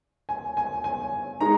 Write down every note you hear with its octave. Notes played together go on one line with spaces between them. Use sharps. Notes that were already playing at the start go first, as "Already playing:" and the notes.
G#5
G#5
G#5
G#3 D#4 A#5